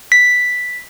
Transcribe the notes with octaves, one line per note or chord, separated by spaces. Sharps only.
B6